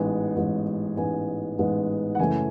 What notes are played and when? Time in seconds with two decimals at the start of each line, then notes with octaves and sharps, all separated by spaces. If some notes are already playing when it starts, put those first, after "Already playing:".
Already playing: A1 G#2 G#3 B3 G#5
0.36 A1 G#2 G#3 B3
0.97 A1 G#2 G#3 B3 G#5
1.58 A1 G#2 G#3 B3
2.15 F#5
2.19 F#1 F#2 E3 A3 G#5